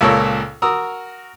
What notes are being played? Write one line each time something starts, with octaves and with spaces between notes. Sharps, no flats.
C#2 A#2 A4 A#4 C#5
F#4 A#4 A#5 D#6 E6